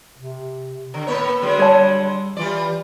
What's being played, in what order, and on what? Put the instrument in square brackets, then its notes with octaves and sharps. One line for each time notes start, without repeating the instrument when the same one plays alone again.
[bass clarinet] C3
[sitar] D3
[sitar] A2 A#3 C#5 [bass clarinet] B4
[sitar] D3 F#3 G#3
[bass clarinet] G3 [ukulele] C#5 A5
[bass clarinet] E3 [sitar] G3 F4 D5